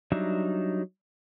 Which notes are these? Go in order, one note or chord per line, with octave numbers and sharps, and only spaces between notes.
F#3 G3 D4 D#4 E5